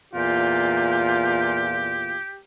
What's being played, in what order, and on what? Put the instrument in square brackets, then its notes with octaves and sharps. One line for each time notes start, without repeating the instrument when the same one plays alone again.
[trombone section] E2 A#2 F4 [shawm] G4